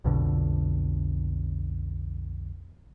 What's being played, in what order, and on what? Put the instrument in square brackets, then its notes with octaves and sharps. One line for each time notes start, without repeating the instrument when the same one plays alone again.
[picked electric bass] B1 F2 B2 D3